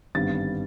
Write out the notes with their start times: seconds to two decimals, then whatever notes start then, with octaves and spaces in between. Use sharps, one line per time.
0.15 G#1 G2 D3 G3 B3 A6